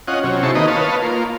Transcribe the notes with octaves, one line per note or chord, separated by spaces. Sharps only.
C#4 F4 D#5 F#5
C3 F#3 C#4
D#4 E4 G#4 C5 A5 C#6
D#3 A#3 D#4 B4 D#5
B4 C#5 D#5 F5 A5
A#3 F4